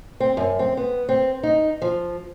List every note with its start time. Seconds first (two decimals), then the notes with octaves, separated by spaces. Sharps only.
0.20 C4
0.37 F#2
0.59 C4
0.77 B3
1.09 C4
1.43 D#4
1.82 F3